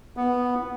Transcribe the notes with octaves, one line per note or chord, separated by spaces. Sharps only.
B3